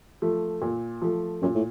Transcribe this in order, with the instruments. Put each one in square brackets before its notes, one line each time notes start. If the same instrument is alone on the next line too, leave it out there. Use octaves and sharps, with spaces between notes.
[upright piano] F3 A3
A#2
F3 A3
[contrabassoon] F#2 [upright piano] A#2
[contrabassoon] A2